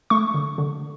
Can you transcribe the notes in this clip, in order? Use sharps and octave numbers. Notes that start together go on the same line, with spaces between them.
A3 C#6
D3
D3